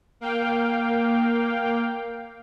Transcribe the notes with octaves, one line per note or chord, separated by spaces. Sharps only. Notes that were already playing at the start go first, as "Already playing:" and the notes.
A#3 F5 G5